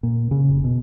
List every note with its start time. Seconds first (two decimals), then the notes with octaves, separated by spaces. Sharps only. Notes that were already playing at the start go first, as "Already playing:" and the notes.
0.03 A#2
0.31 C#3
0.49 F1
0.64 B2